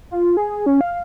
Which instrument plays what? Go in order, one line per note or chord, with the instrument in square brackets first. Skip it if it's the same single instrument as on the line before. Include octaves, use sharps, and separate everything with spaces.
[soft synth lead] F4
G#4
C#4
F5